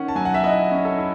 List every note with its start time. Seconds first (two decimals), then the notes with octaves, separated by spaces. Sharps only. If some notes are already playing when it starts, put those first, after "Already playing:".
Already playing: D#3 C#4 F#5
0.08 A5
0.15 F#3 G#5
0.25 F#5
0.34 E5
0.44 E4 D#5
0.71 C#4
0.85 A4
0.98 E4